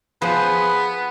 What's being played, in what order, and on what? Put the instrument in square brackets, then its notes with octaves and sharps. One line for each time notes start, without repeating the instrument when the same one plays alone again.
[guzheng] F3 C5 [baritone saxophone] B3 [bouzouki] G#4 [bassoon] B4